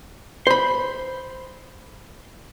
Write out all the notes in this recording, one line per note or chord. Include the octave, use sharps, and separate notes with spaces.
C5 B5